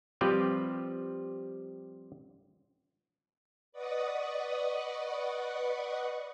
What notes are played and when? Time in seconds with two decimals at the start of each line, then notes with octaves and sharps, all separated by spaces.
0.21 F3 G3 C4 F4 G4 B4
3.72 B4 D5 D#5 F#5 C#6 D#6